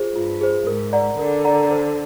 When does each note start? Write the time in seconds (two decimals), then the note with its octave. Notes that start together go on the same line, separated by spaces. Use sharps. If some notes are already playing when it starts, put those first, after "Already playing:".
Already playing: F4 G#4 C5
0.15 G2 F4
0.41 G#4 C5
0.67 G#2 A#4
0.93 D5 F#5 A#5
1.18 D3 A#4
1.44 D5 F#5 A#5
1.71 C5